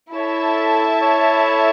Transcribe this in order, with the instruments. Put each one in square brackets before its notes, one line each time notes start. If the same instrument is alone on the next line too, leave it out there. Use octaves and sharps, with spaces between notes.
[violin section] E4 A4 E5 A5 [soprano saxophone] C#5
[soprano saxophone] C#5